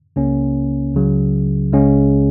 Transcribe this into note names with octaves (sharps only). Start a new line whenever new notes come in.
C#2 C#3 A#3 C#4
C#2 C#3 F#3
C#2 C#3 G#3 C#4